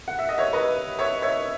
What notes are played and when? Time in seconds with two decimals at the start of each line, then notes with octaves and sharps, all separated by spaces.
0.08 F#5
0.19 E5
0.29 D#5
0.38 C#5 E5
0.53 B4 D#5
0.99 C#5 E5
1.22 C#5 E5